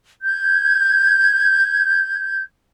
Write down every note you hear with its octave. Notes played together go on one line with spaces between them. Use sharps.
G6 G#6